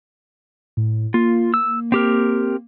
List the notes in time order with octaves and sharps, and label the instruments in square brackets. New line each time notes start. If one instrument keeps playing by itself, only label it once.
[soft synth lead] A2
[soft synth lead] A#3 [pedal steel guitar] F4
[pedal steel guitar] E6
C4 G4 A#4